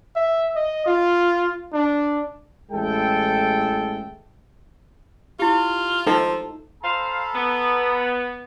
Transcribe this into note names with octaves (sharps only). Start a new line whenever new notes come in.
E5
D#5
F4
D4
A1 G#3 E4 A4 G5
E4 F4 G4
F3 D#4 A4
A4 C5 F5 A#5 B5
B3